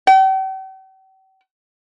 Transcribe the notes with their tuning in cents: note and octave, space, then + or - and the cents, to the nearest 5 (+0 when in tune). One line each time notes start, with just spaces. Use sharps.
G5 -45